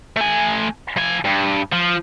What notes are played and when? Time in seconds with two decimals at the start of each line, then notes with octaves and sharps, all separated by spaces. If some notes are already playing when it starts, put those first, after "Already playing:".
0.17 A3 G#5
0.97 F3 G#5
1.25 G2
1.73 F3